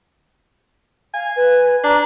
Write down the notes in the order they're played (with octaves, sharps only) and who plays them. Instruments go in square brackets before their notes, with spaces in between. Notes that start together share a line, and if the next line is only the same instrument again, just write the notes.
[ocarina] F5 [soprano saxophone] G#5
[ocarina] B4
[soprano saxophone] D4 [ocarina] A#5